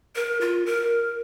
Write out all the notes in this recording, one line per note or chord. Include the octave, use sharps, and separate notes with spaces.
A#4
F4
A#4